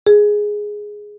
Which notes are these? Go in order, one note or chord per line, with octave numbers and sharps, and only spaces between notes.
G#4